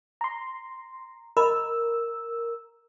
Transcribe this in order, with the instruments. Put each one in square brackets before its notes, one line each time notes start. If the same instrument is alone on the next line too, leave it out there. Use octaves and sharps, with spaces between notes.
[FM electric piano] A#5 C6
[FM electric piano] A#4 E6 [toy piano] D#5 B5